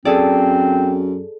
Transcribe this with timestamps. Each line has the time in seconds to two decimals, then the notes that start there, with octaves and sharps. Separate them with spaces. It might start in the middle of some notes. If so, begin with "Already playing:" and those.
0.05 F#2 C4 G#4 A4 D5